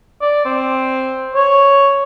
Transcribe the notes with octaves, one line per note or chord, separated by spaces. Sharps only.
D5
C4
C#5